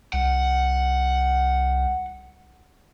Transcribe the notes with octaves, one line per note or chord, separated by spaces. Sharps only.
C2 F#5